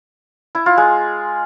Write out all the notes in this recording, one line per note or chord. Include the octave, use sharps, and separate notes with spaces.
E4
F4
G#3